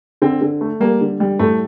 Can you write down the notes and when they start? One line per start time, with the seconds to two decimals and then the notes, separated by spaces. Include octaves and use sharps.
0.22 D3 C4
0.41 D3
0.61 A3
0.80 G3 A#3
1.01 D3
1.20 G3
1.39 A2 A3